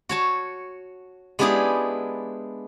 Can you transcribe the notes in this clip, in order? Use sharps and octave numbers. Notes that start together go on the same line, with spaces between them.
F#4 C#5 A5
G#3 B3 D4 E4 G4 G#4